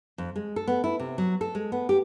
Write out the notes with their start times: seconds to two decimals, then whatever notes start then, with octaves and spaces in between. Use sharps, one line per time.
0.18 F2
0.36 G#3
0.56 A4
0.67 B3
0.84 E4
0.99 C3
1.18 F#3
1.41 A4
1.55 G#3
1.72 B3
1.89 G4